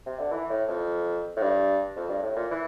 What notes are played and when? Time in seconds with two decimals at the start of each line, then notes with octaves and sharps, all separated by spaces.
0.06 C3
0.19 D3
0.32 E3
0.50 A2
0.68 F2
1.36 A2
1.41 G2
1.96 F2
2.09 G2
2.23 A2
2.36 A#2
2.51 E3